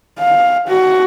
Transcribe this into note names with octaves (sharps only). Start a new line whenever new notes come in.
F5
F#4